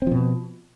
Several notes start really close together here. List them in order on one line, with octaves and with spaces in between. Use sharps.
C4 F3 B2